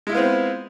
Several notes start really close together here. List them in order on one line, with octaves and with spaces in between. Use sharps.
G#3 E4 F4 B3 C4